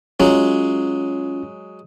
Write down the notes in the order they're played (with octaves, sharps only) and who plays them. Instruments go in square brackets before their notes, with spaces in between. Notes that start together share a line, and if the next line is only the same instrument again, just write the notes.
[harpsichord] F#3 G#3 [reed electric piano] C#4 F4